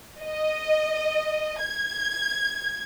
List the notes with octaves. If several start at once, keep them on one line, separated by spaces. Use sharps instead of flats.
D#5
G#6